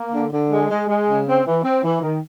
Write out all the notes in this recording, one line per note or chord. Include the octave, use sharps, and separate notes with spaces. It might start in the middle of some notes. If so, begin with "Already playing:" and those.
Already playing: A#3
D3
D3
G#3
G#3
G#3
C#3
C4
E3
C4
E3
D#3